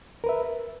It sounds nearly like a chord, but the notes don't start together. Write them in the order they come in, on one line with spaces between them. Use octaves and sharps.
A#4 B4 E5